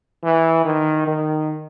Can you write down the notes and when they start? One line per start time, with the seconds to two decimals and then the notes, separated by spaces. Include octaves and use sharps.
0.23 E3
0.65 D#3
1.07 D#3